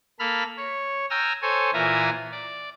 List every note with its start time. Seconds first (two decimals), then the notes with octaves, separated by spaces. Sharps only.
0.19 A#3 A4 B5 F6
0.57 C#5
1.10 G5 G#5 A#5 E6 F6
1.42 A4 C5 C#5 G#5
1.73 A#2 E3 F4 E5 G#5 A#5
2.32 D5